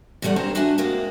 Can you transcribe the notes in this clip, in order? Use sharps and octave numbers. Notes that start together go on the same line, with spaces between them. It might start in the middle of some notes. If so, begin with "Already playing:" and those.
E2 C3 G3 A3 F#5
G2 G#3 C4 C#4 C5 A#5
D4 F#4 G4 E5 G#5 A5
G#2 C3 G#3 A#3 F#4